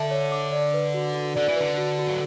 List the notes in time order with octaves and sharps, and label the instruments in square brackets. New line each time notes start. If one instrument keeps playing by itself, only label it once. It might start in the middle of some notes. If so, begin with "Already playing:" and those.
Already playing: [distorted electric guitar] D3 [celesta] E5 A5 D6
[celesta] C#5
D6
D5
B4
F#4
F#4
[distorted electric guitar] D3 [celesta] D5
[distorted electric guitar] E3
[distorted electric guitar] D3 [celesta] B4
[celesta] F#4
F#4
[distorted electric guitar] F#3